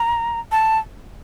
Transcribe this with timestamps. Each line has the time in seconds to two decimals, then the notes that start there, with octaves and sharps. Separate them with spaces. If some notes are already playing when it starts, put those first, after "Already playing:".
Already playing: A#5
0.52 A5